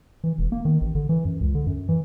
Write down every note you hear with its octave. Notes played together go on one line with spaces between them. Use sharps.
E3
E1
A#3
D#3
A1
D3
E3
F#2
C#2
D3
F#2
E3